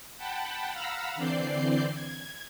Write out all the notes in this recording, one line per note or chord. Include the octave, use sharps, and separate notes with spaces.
F#5 G5 A5 B5
F5 F#5 A#5 B5 E6 F6
D3 E3 C4 D5 G6 C7
G#6